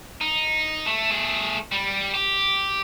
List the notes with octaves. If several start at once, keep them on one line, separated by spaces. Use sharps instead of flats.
D#4
A3
A3 G#4
G3
G4